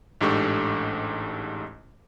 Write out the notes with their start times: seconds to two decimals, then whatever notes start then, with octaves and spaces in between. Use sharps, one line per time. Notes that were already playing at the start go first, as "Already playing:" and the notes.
0.21 A1 G#2 D4 G4 A4 C#6